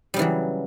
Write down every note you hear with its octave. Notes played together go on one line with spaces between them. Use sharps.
C#3 E3 F#3 G3